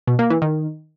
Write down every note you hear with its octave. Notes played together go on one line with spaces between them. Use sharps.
B2
A#3
E3
D#3